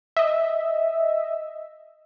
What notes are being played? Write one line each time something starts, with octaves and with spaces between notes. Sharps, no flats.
D#5 E5